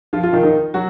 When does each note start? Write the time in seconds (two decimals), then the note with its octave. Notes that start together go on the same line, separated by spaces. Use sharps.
0.13 F3 F4
0.23 F3 F4
0.33 D#3 D#4
0.43 D#3 D#4
0.74 F#3 F#4